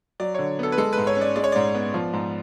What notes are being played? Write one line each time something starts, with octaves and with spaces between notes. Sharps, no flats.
F#3 D5
D3 C#5
B3 A4
B4
G#3 A4
G#2 B4
C#5
C#4
D5
G#3 D5
C#5
G#2 D5
B3
F3
G#2